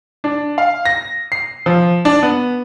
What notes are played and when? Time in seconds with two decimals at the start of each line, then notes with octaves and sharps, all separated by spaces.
0.24 D4
0.58 F5
0.85 A#6
1.32 C7
1.66 F3
2.05 D4
2.23 B3